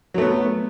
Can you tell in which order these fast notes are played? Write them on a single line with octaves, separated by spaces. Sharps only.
F#3 A3 B3